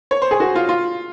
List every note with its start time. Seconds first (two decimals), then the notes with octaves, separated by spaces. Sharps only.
0.11 C#5
0.22 C5
0.31 G#4
0.40 F#4
0.55 F4
0.69 F4